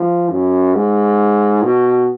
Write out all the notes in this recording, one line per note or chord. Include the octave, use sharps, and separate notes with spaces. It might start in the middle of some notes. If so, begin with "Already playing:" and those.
Already playing: F3
F#2
G#2
B2